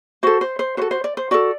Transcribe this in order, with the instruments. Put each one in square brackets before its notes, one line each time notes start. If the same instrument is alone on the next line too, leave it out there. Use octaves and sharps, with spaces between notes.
[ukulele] F#4 A4 C5
C5
C5
F#4 C5
A4
C5
D5
C5
F#4 A4 D5